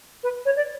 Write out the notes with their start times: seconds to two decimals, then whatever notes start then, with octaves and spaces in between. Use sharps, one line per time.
0.23 B4
0.45 C#5
0.56 D5